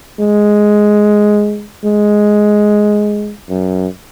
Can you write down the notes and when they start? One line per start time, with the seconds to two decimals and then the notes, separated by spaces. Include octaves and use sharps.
0.20 G#3
1.85 G#3
3.50 F#2